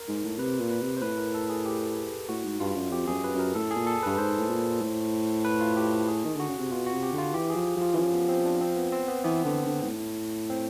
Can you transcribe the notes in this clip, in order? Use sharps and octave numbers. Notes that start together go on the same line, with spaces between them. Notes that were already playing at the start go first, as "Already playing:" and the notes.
Already playing: A#4
G#2
A2
C3 B4
A#2
B4
C3
C5
A2 B4
A#4
A4
G#4
G4
A2 F#4
G#2
G2 F4
F#2
F2 G4
F2 G#4
F#2
B4
F#2 A#4
A2 A4
G#4
A#2
A4
G2 B4
G#2 C5
A2
A#2
A2
B4
F4
G4
G#4
D#3
D3 F#4
C#3
C3
B2 F4
F#4
C3
G4
D3
F4
E3 G4
G#4
F3
F3
F4
E3
F3 C#4
B3
C4
D4
C4
B3
C4
B3
E3 B3
D3
D3
G#2
A2
C4